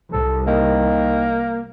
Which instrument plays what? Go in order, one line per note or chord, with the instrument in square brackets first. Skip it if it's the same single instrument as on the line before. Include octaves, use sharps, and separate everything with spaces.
[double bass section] C2 [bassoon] A4
[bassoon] D#3 [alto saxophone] A#3